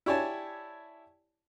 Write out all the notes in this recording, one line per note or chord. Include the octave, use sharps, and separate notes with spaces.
E4 G4 C#5 D5 G#5 A5